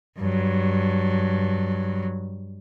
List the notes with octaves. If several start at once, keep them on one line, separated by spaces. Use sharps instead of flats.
G2 F#3